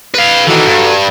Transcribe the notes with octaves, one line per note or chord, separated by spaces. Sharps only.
B4 F5
D#3 E3 F#4 A4 A#5
G2